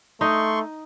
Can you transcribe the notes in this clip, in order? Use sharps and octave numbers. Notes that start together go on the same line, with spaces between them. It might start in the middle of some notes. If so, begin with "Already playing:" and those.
A3 D#4 C6 C#6